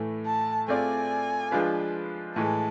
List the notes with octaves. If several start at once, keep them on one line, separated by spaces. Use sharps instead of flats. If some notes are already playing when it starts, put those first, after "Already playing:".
Already playing: A2 E3 A3
A5
A3 C4 F4 G#4 D5 G#5
F3 G#3 D4 F4 B4
A2 E3 G#3 A5